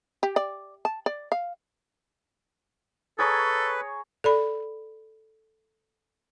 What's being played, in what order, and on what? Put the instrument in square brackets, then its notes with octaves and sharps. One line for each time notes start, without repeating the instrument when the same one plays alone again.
[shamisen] G4
D5
A5
D5
F5
[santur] G#4 C#5 A#5 [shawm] A4 [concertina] B4 [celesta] C#6 D#6
[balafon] A4 D5 B5